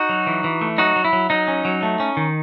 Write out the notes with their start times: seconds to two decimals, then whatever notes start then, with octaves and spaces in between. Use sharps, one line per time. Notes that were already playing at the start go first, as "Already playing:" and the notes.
Already playing: D#4 F#4
0.09 F#3
0.27 E3
0.44 E3
0.61 A3
0.78 F#3 D#4 F#4
0.96 F#3
1.05 E4
1.13 F#3
1.30 F#3 D#4
1.48 C#4
1.65 F#3
1.83 A3
2.00 C#4
2.17 D#3